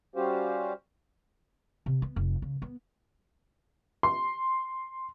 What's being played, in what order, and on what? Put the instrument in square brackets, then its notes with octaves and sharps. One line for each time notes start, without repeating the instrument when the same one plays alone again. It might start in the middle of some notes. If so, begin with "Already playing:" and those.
[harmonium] G3 C#4 F#4 G4 C5 F5
[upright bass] C3
B3
F1
C#3
B3
[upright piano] C6